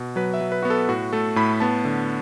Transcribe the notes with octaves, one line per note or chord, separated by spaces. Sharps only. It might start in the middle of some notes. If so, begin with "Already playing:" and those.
Already playing: B2
F#3 B4
E5
F#3
B4
B3 F#4
A4
A2 F#4
A3 A4
A2 B5
B3 A5
D3